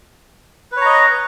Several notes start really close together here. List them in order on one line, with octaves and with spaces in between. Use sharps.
B4 C#5 A#5 D#5